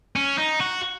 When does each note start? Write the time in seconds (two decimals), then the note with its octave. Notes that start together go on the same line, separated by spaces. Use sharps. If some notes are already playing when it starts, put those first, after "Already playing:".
0.16 C#4
0.38 D#4
0.60 F#4